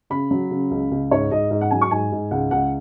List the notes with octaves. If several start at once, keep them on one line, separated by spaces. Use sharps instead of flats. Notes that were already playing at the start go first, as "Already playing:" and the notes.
C#3 B5
F#3
C#3
C#2
C#2
G#2 C#5
G#2 D#5
G#2 D#5
F#5
F#3 G#5
C#6
G#2 G#5
G#2
C#2 F#5
C#2 F#5